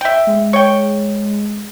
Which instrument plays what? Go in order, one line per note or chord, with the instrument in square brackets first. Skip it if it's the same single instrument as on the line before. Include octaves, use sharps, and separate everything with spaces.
[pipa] E5 G5
[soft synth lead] G#3
[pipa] C#5 G5